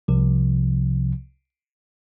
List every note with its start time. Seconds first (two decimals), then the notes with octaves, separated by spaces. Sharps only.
0.08 C2 C3 F3